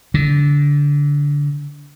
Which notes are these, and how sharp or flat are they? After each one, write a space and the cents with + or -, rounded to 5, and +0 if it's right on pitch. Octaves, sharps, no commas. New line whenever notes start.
D3 -25